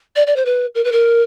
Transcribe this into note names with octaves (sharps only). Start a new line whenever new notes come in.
D5
D5
C5
B4
A#4
B4
A#4